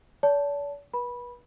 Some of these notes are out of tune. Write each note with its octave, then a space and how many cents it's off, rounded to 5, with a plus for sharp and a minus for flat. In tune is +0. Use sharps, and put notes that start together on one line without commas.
D5 -45 A5 +0
B4 -35 B5 -15